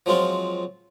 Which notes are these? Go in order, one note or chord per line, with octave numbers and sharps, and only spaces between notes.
F3 F#3 G#3 C4 F4